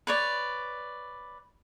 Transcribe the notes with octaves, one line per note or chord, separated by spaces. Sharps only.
B4 C#5 D5